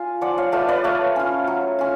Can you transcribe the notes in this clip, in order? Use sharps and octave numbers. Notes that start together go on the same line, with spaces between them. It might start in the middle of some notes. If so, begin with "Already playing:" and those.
Already playing: F4 F5 G#5
F3 D5 F#5
C#5 F5
A3 F4 B4 D5
B4 D5
A3 C#5 F5
C#4 F4
F#3
C#4 F4